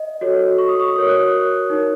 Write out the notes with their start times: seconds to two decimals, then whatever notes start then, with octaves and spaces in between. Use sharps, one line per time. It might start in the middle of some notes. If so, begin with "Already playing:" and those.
Already playing: D#5
0.21 F#4 A4 C#5
0.58 C#6
0.68 D#6
0.79 C#6
0.95 F#4 A#4 C#5 D#6
1.09 F#6
1.70 D#4 A#4 C#5